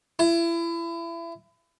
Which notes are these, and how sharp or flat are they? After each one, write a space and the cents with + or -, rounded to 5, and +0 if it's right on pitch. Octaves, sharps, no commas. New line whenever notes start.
E4 +30